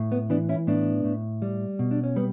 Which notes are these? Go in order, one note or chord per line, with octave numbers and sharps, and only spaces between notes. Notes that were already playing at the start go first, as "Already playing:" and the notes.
Already playing: A2
B3
E3 B3 D4
C#4 E4
A2 B3 D4
A2
G3
B2
D4
C#4
G3 B3